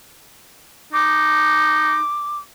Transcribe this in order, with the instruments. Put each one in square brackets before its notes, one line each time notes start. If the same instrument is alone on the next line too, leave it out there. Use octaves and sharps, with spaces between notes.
[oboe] D#4 [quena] D6